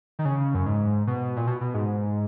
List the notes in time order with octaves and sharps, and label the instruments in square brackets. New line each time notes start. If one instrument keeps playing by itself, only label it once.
[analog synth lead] D#3
C#3
F#2
G#2
B2
A#2
B2
B2
G#2